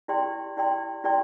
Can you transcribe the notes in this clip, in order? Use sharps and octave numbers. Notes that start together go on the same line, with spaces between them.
E4 G4 D5 G5 C6
E4 G4 D5 G5 C6
E4 G4 D5 G5 C6